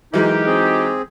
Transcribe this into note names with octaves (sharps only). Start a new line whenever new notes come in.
E3 F#3 G#3 D#4 G4 A#4
C4 G#4